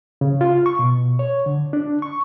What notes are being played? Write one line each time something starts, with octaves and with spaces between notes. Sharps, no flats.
C#3
F4
C#6
B2
C#5
D3
D4
C#6